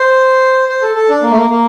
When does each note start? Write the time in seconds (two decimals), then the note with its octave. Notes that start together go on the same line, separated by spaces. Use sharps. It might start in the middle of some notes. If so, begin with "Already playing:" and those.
Already playing: C5
0.69 C5
0.82 A4
0.95 A4
1.09 D4
1.22 A#3
1.31 A3
1.36 A#3
1.50 A#3